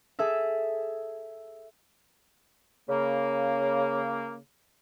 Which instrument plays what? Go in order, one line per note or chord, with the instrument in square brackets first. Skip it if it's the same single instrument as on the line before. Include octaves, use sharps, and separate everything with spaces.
[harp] G#4 A4 E5
[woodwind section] C#3 A#3